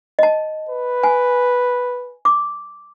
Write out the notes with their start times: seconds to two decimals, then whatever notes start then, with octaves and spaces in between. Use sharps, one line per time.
0.19 D#5 A5
0.69 B4
1.03 G#5
2.25 D6